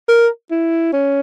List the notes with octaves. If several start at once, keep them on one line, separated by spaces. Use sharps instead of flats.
A#4
E4
C#4